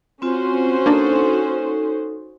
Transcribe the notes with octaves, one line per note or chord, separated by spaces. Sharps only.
C4 C#4 F4 F#4 C5
A#3 D4 D#4 A4